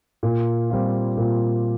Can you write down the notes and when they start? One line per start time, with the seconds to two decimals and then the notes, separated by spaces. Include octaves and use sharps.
0.23 A#2
0.70 G3 C4 F4
1.17 A#2